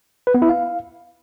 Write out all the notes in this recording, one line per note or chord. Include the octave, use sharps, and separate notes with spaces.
B4
B3
E4
F5